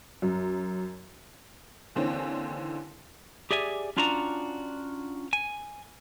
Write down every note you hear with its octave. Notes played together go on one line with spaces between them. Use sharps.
F#2
D#2 D3 E3 C4 C#4
G4 G#4 D5 E5 G#5
C#4 D4 F4 F#4 D5 A#5
G#5